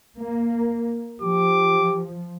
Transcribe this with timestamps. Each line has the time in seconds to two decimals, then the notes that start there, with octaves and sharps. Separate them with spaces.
0.19 A#3
1.22 F3 G4 D6